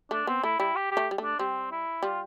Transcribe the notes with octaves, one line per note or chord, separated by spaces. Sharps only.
A3 D4
B3 C4
A3 E4
G3 E4
G4
G4
A3
G3
A3
D4
G3 C4
E4
G3 F4